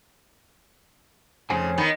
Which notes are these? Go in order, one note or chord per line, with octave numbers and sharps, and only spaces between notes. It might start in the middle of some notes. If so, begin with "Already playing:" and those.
F2 C#3 C5 G#5
D#3 B3